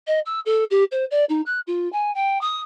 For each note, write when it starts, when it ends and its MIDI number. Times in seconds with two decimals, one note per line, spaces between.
0.07 0.19 75
0.25 0.39 88
0.45 0.64 69
0.70 0.84 67
0.91 1.04 72
1.10 1.24 74
1.29 1.41 63
1.45 1.59 90
1.67 1.90 65
1.92 2.12 80
2.14 2.40 79
2.41 2.60 87